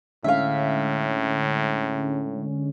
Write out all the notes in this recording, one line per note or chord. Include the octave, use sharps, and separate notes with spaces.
A2 D3 G#3 C#4 E5 F5